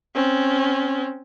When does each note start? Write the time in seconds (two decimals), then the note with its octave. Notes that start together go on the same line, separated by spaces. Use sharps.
0.15 C4 C#4